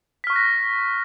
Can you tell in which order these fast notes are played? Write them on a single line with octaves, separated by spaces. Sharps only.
B6 F6 C#6 F#6 A#6